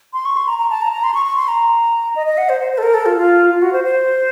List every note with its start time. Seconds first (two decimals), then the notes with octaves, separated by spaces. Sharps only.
0.13 C6
0.25 C#6
0.37 C6
0.48 A#5
0.58 A#5
0.70 A5
0.82 A#5
0.92 A#5
1.04 C6
1.14 C#6
1.26 C#6
1.37 C6
1.48 A#5
2.16 D#5
2.27 D#5
2.38 F#5
2.49 C5
2.61 C5
2.72 C5
2.78 A4
2.83 A#4
2.94 A4
3.06 F4
3.16 F4
3.50 F4
3.62 F#4
3.73 C5
3.84 C5